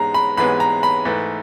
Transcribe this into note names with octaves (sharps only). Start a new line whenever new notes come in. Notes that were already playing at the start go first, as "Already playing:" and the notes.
Already playing: G#2 E3 G#3 B3 A#5
B5
G#2 E3 G#3 B3 B5
A#5
B5
G#2 E3 A3